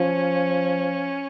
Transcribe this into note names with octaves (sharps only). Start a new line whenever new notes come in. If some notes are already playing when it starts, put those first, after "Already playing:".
Already playing: F3 C#4